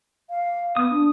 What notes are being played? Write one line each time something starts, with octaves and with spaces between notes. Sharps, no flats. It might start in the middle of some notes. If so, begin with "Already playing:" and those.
F5
B3 D#6
D4